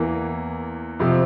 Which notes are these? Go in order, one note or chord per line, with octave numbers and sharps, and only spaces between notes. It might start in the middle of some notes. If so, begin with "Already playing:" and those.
Already playing: E2 E3 A#3
F2 C3 F3